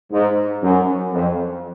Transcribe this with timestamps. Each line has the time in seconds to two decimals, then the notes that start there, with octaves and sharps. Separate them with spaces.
0.11 G#2
0.62 F#2
1.12 F2